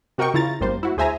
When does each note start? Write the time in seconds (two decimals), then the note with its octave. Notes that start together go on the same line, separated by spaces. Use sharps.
0.18 C3 F#4 A#4 D#5 G5 C#6
0.34 C#3 E4 F4 A#5 A6
0.60 G#1 F#2 G3 A#3 C5
0.83 E4 F#4
0.97 D2 G#4 C5 E5 G#5 A#5